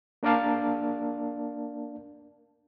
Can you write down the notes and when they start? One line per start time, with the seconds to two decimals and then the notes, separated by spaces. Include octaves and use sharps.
0.23 A#3 D4 A#4 D5 F5 A5